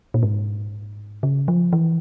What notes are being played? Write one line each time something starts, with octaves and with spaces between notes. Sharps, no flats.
A#2
G#2
C#3
F3
E3